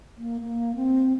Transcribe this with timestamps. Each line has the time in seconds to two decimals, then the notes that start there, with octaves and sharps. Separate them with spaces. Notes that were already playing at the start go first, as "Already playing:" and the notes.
0.17 A#3
0.41 A#3
0.76 C4